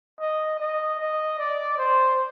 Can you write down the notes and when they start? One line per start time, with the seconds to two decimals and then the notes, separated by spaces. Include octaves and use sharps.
0.20 D#5
0.60 D#5
0.99 D#5
1.38 D5
1.78 C5